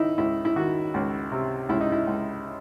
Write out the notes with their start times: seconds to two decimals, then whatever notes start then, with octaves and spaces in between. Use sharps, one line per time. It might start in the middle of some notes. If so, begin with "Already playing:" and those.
Already playing: C#2 D#3 D#4 E4
0.18 C#2 E4
0.45 E4
0.56 D#3 F#4
0.94 C#2
1.32 C3
1.69 C#2 E4
1.81 D#4
1.92 E4
2.07 C#2